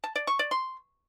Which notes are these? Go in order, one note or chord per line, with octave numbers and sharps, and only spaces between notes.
A5
D5
C#6
D5
C6